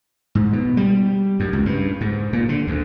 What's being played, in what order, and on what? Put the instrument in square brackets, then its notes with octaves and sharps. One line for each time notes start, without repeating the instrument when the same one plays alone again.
[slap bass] G#2
B2
G3
F#2
C#2
G2
G#2
A#2
D3
D2